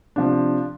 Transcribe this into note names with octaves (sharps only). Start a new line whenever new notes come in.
C3 F3 D4